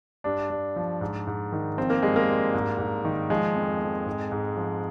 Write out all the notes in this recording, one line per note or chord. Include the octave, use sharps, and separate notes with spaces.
G2 D4
G2
F3
G#2
G#2
D#3
F3 C4
A#3
G2 G#3
A#3
G2
G#2
G#2
D#3
F3 G#3
F2
F2
G#2
G#2
F3